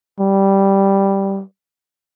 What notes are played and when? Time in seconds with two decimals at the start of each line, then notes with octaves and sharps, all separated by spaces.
0.20 G3